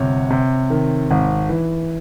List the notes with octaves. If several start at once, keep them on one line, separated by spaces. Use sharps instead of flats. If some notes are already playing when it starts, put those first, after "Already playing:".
Already playing: G1 C3 C#5
C3
D#3
G#1
E3